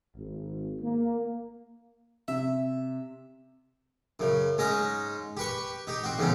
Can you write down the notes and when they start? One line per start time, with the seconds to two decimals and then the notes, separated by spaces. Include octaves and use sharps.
0.15 G#1
0.81 A#3
2.28 C3 E5
4.20 F#2 C#3
4.58 G#2 G#3 C#4 D#5 D#6
5.37 G4 B4 C#6
5.87 D#4 G4
6.04 C4 F#4
6.18 E2 G#2 C#3 F#3 C#4